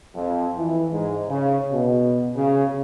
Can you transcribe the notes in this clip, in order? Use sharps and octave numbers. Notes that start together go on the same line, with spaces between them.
F2
E3
G#2
C#3
B2
C#3